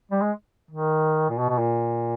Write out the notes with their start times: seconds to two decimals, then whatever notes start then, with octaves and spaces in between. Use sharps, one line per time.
0.12 G3
0.21 G#3
0.71 D#3
1.30 A#2
1.39 B2
1.49 B2
1.59 A#2